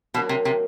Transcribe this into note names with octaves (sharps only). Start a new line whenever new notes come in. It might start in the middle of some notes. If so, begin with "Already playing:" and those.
B2 F#3 A#3 D4
C3
C3